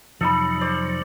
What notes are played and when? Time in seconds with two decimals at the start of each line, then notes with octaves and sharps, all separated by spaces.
0.21 F2 C3 F3 F#3 D#4 A4 D#5 B5
0.61 C5 D5